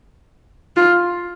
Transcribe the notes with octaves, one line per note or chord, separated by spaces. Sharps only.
F4